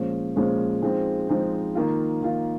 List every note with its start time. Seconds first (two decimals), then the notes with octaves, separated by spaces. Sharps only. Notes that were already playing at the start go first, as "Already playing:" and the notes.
Already playing: A#2 F3 G#3 C#4
0.36 A#2 F3 G#3 C#4
0.82 F3 G#3 C4 D#4
1.28 F3 G#3 C4 D#4
1.75 D#3 A#3 F4
2.22 D#3 A#3 F4